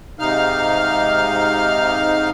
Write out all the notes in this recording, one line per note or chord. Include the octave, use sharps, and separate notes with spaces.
G#2 C3 D#4 F5 F6